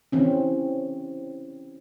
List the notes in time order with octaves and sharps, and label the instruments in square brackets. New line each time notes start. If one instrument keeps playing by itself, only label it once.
[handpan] E3 C4 C#4